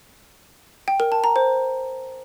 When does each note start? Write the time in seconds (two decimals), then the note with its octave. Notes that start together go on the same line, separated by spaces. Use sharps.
0.88 G5
1.00 A#4
1.12 A5
1.24 A#5
1.36 C5